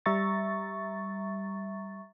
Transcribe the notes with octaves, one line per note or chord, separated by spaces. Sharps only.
G3 E5 A#5 C#6 A6